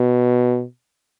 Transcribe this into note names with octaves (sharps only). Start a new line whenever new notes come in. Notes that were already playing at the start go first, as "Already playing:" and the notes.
Already playing: B2